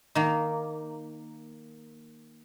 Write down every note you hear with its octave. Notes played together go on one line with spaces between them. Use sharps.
D#3 A#3